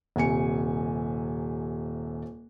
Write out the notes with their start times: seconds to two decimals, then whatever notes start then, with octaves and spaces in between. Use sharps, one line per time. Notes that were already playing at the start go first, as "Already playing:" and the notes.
0.16 D#1 C3 G#5 C#7